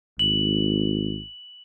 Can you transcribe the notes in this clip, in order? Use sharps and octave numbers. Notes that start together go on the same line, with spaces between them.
G#1 F#7